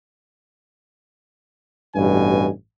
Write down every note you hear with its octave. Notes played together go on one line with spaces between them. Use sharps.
A1 G2 B2 G#5